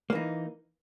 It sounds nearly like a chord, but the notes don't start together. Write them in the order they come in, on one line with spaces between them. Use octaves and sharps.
A#3 E3 D#4